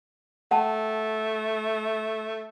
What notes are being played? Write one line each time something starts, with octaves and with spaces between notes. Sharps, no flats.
A3 F#5 G5 A5